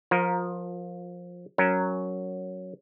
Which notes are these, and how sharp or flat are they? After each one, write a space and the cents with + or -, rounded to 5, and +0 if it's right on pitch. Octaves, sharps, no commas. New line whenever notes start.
F3 +20 F4 +40 A#4 +5
F#3 +0 C#4 +0 A#4 -5